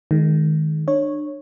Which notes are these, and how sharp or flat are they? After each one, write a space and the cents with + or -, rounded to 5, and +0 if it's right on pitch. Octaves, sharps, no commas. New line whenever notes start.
D#3 +0 G#3 +30
D4 +30 C#5 -10